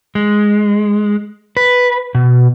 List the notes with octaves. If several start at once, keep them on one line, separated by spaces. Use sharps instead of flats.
G#3
B4
B2